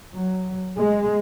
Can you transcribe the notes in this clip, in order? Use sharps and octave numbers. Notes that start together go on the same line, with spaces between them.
F#3
G#3